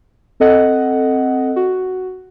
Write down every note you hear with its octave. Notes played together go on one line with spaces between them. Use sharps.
C4 A4 D#5 F#5
F#4